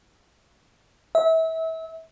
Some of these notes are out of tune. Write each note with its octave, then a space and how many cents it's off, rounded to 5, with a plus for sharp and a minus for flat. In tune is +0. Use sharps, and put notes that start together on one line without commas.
E5 -30